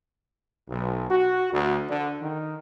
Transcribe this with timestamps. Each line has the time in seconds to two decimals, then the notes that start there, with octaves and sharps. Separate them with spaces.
0.70 B1
1.10 F#4
1.53 D2
1.90 D3
2.21 D#3